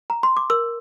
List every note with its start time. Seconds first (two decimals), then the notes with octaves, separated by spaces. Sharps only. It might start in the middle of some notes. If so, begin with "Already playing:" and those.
0.10 A#5
0.23 C6
0.37 D6
0.50 A#4 E6